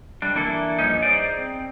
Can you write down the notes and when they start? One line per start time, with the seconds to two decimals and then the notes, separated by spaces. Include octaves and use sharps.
0.22 G3 D4
0.35 E3 A#3 D4 E4 A4
0.79 G2 F3 C#4 D#4
1.02 D#4 G#4 C5 D5
1.38 C4